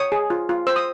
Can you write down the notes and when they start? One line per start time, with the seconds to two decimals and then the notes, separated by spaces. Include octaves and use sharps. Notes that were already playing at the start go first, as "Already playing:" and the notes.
Already playing: C#5 D#6
0.12 G#4
0.30 F4
0.49 F4
0.67 C5 E6
0.76 D#6